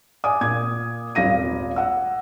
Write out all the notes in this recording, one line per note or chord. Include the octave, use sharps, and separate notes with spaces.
D5 G#5 D6 D#6
A#2 G#6
D#1 G#1 F5 A#6 D#7
F#5 E6